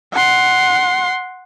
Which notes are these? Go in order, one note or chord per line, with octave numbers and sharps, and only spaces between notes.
F#5 C6